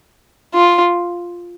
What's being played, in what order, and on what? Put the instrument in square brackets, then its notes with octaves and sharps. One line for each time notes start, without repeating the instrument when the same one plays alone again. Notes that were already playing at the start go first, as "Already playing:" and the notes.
[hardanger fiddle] F4